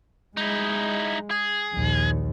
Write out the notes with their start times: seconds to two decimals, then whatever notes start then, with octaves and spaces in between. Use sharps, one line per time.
0.37 G#3 D#4 E4
1.31 G#4
1.74 A#1 D#2